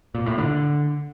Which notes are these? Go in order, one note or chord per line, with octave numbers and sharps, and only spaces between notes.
A#2
A2
D3